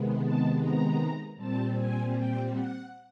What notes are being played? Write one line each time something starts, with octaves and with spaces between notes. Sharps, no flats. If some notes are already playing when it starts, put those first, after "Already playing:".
Already playing: C3 D#3 G#3 B3
A5
A#5
A#2 G3 C4 A5
G#5
G5
F#5